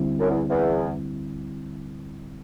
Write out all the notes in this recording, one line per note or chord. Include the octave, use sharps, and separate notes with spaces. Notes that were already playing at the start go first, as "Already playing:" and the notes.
Already playing: D2 D3 G3 C4 E4
F#2
E2
E2